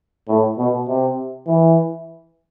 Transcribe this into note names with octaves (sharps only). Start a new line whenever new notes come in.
A2
B2
C3
E3